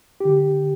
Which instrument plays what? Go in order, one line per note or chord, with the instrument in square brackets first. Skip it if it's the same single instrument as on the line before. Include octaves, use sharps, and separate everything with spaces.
[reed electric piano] D3 G4